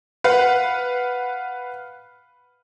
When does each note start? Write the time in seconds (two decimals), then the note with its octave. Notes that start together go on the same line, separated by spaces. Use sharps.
0.24 B4 F5 F#5